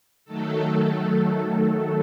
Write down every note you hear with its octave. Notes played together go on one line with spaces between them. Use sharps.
D#3 F#3 A3 A4